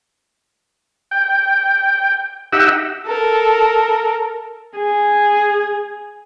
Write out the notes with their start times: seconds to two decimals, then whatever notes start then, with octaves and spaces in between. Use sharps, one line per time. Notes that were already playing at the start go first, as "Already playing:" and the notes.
1.11 G5
2.53 D#4 G4 E5 F#5 E6
3.06 A4 A#4
4.76 G#4